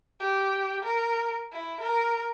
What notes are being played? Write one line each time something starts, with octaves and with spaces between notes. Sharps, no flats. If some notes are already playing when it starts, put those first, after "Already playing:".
G4
A#4
E4
A#4